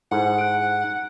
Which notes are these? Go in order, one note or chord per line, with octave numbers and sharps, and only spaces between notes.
G#2 E4 A4 C5 F#5
F#6 D7